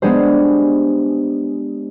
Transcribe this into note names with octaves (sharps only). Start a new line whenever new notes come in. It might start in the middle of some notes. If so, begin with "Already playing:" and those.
G#3 B3 D4 G4 G#4 C5